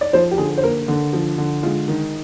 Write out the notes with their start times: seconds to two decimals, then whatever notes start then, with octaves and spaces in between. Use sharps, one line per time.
0.01 D5
0.13 F3 C5
0.31 G4
0.38 D3 G#4
0.57 C5
0.63 A#3 A#4
0.88 D3
1.13 F3
1.38 D3
1.63 G#3 F4
1.88 D#3